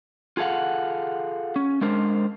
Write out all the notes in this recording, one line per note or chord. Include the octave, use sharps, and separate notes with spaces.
F4 G#4 A4 F5 F#5
C#4
G#3 D4 A#4 C5